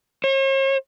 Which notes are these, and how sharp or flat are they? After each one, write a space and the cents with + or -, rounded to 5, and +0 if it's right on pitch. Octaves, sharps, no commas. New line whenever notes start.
C#5 -45